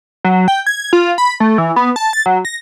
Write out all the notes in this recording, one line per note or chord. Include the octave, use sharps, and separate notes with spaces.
F#3
G5
G#6
F4
B5
A3
E3
B3
A5
A6
F#3
A#6